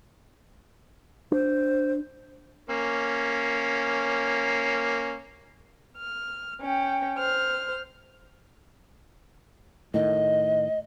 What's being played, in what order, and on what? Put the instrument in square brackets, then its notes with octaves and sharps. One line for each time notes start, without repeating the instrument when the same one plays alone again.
[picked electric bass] D4 [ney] C5
[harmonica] A#3 C#4
[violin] F6
C#4 G5
C5 F6
[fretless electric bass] A2 D#3 [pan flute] D#5